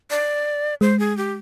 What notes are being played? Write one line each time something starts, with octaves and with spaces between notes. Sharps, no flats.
D5
G#3 C5
G#4
G4